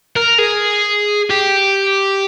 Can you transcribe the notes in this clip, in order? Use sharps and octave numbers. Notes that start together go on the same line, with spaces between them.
A#4
G#4
G4